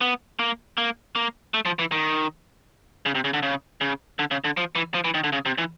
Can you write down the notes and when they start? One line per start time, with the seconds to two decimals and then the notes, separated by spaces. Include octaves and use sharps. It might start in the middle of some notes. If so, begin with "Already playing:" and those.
0.01 B3
0.39 A#3
0.78 A#3
1.16 A#3
1.54 A3
1.66 F3
1.79 E3
1.92 D#3
3.06 C#3
3.15 C3
3.24 C#3
3.34 D3
3.43 C#3
3.81 C#3
4.19 D3
4.31 C#3
4.44 D3
4.57 F3
4.75 E3
4.94 F3
5.04 E3
5.14 D#3
5.24 D3
5.32 C#3
5.46 C3
5.58 E3